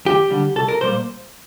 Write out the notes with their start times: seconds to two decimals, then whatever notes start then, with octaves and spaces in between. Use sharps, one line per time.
0.05 D#2 G4
0.30 D3 G3
0.56 C2 A4
0.68 A#4
0.81 A#2 G3 A#3 C5